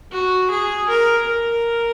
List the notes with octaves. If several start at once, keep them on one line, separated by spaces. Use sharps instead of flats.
F#4
G#4
A#4
A#4